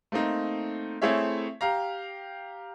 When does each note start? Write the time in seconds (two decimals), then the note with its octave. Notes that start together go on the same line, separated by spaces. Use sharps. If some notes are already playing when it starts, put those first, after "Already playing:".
0.12 A3 A#3 C4 D#4
1.02 A3 C4 E4 G#4 C#5 E5
1.61 G4 F5 A#5